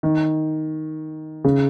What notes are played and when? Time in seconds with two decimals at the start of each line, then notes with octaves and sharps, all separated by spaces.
0.03 D#3
1.44 C#3